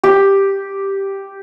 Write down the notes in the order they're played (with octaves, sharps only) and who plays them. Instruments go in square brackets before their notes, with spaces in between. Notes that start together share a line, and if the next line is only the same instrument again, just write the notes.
[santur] G4